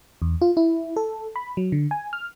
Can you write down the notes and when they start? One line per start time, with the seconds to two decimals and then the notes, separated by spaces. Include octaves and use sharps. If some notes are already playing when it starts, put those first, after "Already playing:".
0.22 E2
0.41 F4
0.57 E4
0.96 A4
1.36 B5
1.57 F#3
1.72 D3
1.91 G#5
2.13 F6